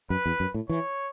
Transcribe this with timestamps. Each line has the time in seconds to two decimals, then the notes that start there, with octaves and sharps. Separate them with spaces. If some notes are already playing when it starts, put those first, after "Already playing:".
0.10 F#2 B4
0.26 E2
0.40 F#2
0.54 A2
0.69 E3 C#5